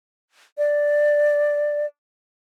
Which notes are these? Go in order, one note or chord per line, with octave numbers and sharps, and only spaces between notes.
D5